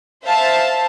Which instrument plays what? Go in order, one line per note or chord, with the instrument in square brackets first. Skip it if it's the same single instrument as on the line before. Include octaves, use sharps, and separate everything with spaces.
[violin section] C5 E5 F5 A5